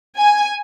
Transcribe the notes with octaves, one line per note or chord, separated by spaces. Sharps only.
G#5